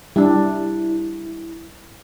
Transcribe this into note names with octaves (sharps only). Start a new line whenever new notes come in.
G3 D4 E4